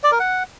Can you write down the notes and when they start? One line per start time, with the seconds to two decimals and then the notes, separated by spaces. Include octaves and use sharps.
0.04 D5
0.12 A#4
0.20 F#5